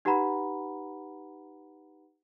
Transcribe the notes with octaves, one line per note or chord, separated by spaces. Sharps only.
D#4 G4 B4 F#5 A#5 B5